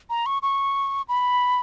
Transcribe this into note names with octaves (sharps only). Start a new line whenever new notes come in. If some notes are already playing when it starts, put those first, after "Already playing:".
A#5
C#6
C#6
B5